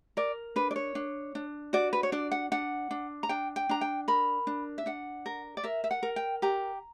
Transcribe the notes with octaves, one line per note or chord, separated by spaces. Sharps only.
A#4 D5
D4 B4
D5
C#5
D4
D4
F#4 D5
B4
C#5
D4 D5
F#5
D4 F#5
D4
A#5
D4 G5
G5
D4 A#5
G5
A#4 B5
D4
E5
D4 F#5
A#4
D5
A#4 E5
E5
F#5
A#4
G5
G4 A#5